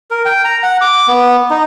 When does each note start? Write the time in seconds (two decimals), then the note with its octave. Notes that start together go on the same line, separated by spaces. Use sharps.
0.11 A#4
0.25 G5
0.45 A#5
0.63 F#5
0.81 D6
1.08 B3
1.50 D#4